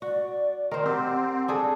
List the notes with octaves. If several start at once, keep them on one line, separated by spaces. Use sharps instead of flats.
F#4 D5
D#3 A#4 C5
C4 G4 F#5
D4 G#4 A4